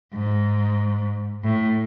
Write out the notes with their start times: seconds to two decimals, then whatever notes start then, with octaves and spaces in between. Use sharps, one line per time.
0.14 G#2
1.44 A2